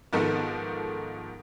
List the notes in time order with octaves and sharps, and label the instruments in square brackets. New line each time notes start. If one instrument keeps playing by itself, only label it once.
[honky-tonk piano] G#2 D#3 F3 A3 B3